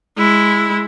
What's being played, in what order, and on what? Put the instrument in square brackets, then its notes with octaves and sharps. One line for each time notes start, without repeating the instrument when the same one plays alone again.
[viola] G#3 E4